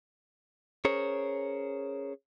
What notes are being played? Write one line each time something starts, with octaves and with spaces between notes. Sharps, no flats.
C#4 G#4 A#4 C5 C#5